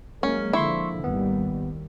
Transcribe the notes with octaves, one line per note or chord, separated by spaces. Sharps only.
F#3 G#3 A#3 C#4
D3 F3 E4 C6 C#6 E6
G#1 D#2 D#3 G3 B3